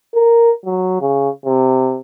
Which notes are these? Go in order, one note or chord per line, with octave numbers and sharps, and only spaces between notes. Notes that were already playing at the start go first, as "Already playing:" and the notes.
A#4
F#3
C#3
C3